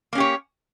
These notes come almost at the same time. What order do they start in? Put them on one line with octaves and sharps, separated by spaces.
A#3 C#4 G4 C#5